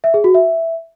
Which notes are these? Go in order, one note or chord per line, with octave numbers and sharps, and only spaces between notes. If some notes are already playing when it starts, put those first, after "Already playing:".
E5
G#4
F#4
E5